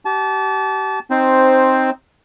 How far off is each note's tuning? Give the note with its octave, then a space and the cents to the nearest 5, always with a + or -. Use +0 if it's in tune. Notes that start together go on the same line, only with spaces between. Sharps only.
G4 -35 A5 -25
C4 +5 D#4 +0 C5 +0